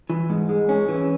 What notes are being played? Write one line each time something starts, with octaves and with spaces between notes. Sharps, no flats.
E3
G#2
G#3
C#4
E3